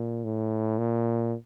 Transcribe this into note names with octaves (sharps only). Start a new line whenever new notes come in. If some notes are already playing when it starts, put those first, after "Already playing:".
Already playing: A#2
A2
A#2